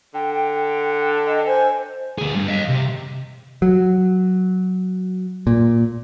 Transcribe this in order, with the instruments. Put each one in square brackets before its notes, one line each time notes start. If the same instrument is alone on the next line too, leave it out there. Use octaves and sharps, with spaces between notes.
[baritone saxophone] D3 [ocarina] G5
[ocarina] G5
[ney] D#5
[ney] C5 [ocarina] G#5
[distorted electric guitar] D2 G#4
G2
D#5 F5
C3
[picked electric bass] F#3
A#2